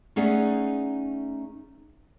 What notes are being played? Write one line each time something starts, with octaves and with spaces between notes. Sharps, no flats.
A3 C#4 D#4 G#4 D5 F#5